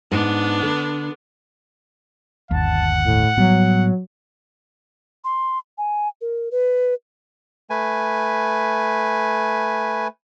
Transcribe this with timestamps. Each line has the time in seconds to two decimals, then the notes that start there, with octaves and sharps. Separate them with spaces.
0.12 G#2 B3 D4
0.62 D3
2.51 G1 D#2 F#5 A5
3.04 A2
3.37 A2 F#3 G3 B3
5.24 C6
5.78 G#5
6.21 A#4
6.51 B4
7.70 A3 B4 G#5